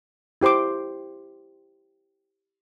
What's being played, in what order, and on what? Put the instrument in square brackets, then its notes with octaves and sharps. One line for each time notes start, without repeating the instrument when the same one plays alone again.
[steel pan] E4 G4 C5 C6 D6